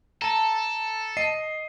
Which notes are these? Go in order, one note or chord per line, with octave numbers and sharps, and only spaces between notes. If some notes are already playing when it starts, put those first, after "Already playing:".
A4 A5 A#5
D#5 C7 D#7